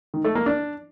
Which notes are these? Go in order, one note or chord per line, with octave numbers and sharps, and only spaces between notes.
D#3
A3
A#3
D4